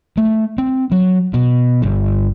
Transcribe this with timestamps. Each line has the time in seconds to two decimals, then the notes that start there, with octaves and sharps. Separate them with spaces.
0.17 A3
0.58 C4
0.92 F#3
1.34 B2
1.82 G1